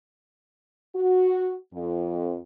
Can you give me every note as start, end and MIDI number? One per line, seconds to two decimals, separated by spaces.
0.95 1.55 66
1.74 2.40 41